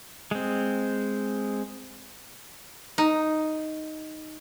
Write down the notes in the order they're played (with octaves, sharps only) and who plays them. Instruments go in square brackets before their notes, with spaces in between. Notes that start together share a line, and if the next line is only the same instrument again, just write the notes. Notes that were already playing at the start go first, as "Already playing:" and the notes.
[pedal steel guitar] G#3 C4
[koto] D#4